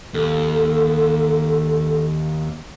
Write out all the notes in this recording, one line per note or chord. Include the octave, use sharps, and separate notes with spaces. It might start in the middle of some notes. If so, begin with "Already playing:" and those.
D#2 A4